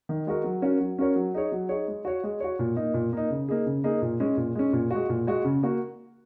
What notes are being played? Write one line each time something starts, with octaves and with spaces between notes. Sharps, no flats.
D#3
G#3 F#4 A#4
F#3
C#4 F#4 A#4 C#5
F#3
C#4 F#4 A#4 C#5
F#3
D#4 G#4 C#5
F#3
D#4 G#4 C#5
G#3
F#4 C#5
G#3
F#4 C#5
A#2
A#3 D#4
A#2
A#3 D#4
C#3
A#3 D#4 G#4
C#3
A#3 D#4 G#4
A#2
G#3 C#4
A#2
G#3 C#4
A#2
G#3 F#4
A#2
G#3 F#4
C#3
A#3 F#4